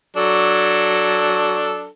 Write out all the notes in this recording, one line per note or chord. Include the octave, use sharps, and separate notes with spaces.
F#3 D4 A4